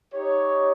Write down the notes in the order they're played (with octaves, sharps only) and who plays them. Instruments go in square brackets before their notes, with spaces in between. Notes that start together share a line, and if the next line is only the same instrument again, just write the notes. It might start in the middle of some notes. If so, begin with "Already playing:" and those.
[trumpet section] D#4 G4 C#5